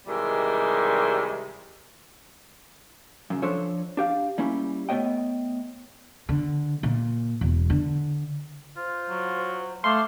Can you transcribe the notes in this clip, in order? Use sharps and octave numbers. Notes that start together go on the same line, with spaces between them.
C3 D#3 E3 G3 G#3
F#2 C#3
F3 D4 A4 C5 C#5
D4 G4 F5
G3 A#3 C#4 E4
A3 B3 C4 C#5 D#5 G5
D3
A#2
E1
D3
F4 C5
F#3
A3 F5 C6 D6 G6